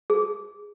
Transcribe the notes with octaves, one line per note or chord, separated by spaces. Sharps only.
G#4